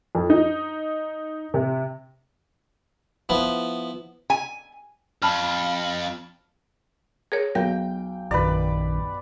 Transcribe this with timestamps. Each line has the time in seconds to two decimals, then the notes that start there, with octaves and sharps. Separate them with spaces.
0.15 F2
0.30 D#4
1.54 C3
3.29 F3 B3 E4
4.30 G#5
5.22 F2 A5 B5 F6
7.32 G#4 A#4 C#5
7.55 B1 A#4 G5
8.31 A#1 F#2 D#3 B4 D5